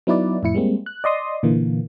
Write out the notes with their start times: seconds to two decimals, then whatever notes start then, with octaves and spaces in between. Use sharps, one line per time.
0.07 F#3 B3 D#4 E4 B4 D5
0.43 F2 A2 E4 C#7
0.54 G3 G#3 A#3 C4
0.86 F#6
1.04 D5 D#5 C6 D#6
1.43 A#2 D3 E3 A#3